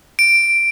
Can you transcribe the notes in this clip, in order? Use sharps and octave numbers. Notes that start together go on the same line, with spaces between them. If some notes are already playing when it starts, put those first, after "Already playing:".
D7